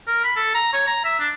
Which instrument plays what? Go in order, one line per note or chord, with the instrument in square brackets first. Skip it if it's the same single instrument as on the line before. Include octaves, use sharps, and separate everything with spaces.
[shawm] A#4
B5
A4
A#5
C#5
A#5
E5
D4